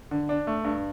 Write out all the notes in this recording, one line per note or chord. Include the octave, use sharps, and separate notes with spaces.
D3
D4
A3
G2